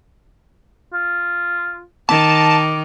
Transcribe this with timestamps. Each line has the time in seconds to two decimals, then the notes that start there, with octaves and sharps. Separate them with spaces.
0.93 F4
2.09 D#3 A5 D6